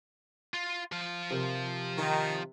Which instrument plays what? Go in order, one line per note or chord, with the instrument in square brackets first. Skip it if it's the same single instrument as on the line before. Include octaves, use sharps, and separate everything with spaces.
[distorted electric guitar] F4
F3 F5
[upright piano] C3 A#4
[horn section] D#3